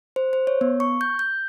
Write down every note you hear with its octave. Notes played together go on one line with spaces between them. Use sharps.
C5
C5
C#5
B3
C#6
G6
G6